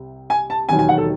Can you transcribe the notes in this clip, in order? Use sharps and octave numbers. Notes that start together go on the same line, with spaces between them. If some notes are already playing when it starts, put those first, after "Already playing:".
Already playing: C2 C3
G#5
A5
E1 D#2 D#3 F#3 G#5
G#5
F#5
A4